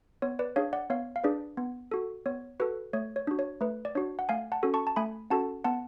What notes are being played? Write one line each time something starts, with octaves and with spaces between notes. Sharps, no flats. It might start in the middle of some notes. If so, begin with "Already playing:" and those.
B3 C#5
B4 D5
D4 G#4 C#5 F5
D5 F#5
B3 C#5 F5
F5
D4 G#4 B4 D5
B3
F#4 A4
B3 C#5
F#4 A4 B4
A3 C#5
C#5
D4 F#4
C#5
A3 B4
D5
D4 F#4 C#5
F#5
A3 F5 G#5
F#5 A5
C#4 F#4 A4
A5 C#6
A5
A3 G#5 B5
C#4 F#4 A4 F#5 A5
B3 F#5 A5